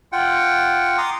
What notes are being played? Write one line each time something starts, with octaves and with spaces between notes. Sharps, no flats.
F4 F#5 G5
A#5 C6 D6 D#6